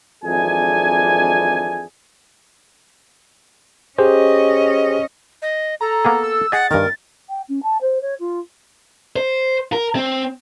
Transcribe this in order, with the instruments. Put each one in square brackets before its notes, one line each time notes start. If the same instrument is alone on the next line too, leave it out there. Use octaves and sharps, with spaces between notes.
[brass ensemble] G#1 F2 E3 D4 G#4 G#5
[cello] C#4 D#5 [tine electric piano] G4 G#4 C5
[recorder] D#5
[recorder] A4 [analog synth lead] A#5
[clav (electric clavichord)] A#3 B3 G#4
[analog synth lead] E6
[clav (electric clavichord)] G#4 D#5 [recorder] F#5 [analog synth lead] A6
[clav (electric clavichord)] G2 D#3 [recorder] A#4
[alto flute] G5
C#4
A5
C5
C#5
F4
[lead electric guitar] C5
A#4
C4